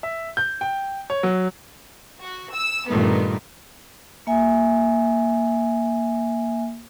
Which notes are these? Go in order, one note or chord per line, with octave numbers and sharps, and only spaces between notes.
E5
G6
G5
C#5
F#3
F#4
E6
G2 A#2 D#3 A3 B3
A#3 E5 G#5